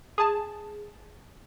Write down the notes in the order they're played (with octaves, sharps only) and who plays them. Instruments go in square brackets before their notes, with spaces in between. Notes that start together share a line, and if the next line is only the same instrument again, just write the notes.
[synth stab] G#4 A5